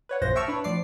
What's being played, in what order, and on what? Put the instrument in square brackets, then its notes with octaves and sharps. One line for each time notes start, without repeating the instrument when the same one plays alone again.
[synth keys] B4 C#5 F#5
A#1 F#2 A#2 C5 A#6
E5 G5 A5 C#6 E6 F6
D4 B4 C#5
A2 F3 D5 D6 C7